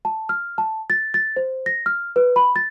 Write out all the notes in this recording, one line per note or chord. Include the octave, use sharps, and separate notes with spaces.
A5
F6
A5
A6
A6
C5
A#6
F6
B4
B5
A6